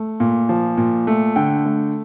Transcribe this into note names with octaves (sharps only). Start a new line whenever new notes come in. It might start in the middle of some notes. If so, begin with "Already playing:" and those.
Already playing: A3
A#2
F3
A#2
A3
D3 G5
A3